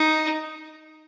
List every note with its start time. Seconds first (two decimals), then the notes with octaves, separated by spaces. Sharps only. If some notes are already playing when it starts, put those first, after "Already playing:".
Already playing: D#4